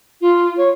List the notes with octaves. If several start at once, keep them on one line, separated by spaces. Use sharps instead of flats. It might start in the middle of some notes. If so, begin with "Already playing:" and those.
F4
C#5